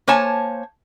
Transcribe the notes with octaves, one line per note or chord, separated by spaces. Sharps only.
A#3 C5 C#5 G#5 A5